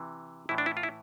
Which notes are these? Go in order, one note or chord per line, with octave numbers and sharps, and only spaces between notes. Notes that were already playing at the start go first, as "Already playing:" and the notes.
Already playing: C3 E3
A2 E3 E4
D4
E4
F4
E4